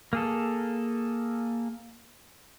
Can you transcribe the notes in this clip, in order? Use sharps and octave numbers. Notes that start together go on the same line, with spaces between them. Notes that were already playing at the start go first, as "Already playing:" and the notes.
A#3 G#4 A4